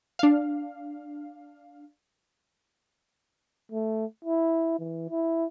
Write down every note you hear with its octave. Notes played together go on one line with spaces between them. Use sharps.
D4 F5
A3
E4
E3
E4